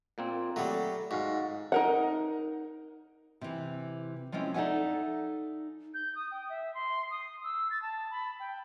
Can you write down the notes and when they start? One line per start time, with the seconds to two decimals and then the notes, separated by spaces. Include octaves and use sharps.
0.18 A#2 A#3 C4
0.56 F#3 G3 A3
1.11 G#2 F#4 F5
1.72 D#4 A#4 F#5
3.41 C3 E3
4.32 F3 G#3 C4 C#4 E4
4.54 D#4 A4 D5 E5 F#5 G#5
5.94 G6
6.15 D#6
6.31 G5
6.49 E5
6.74 C6
7.11 D#6
7.44 E6
7.71 A6
7.82 A5
8.11 B5
8.40 G5